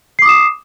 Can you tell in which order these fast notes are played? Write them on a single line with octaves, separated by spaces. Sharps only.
C7 D6 D#6 E7